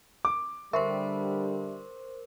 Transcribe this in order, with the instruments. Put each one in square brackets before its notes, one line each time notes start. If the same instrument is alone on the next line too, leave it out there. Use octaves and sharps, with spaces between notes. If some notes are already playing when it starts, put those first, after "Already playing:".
[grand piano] D6
[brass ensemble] D3 G3 [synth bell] A#4 C5 [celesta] E5 [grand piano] C6 C#6